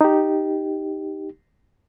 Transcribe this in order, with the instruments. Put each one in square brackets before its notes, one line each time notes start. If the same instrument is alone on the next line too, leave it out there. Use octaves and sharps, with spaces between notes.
[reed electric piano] D#4 G4